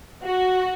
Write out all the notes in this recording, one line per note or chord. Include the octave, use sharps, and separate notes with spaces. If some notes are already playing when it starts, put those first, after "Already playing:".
F#4